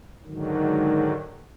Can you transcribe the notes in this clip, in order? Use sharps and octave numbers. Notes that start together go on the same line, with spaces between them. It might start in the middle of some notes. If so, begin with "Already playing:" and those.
G#2 D3 D#3 F#3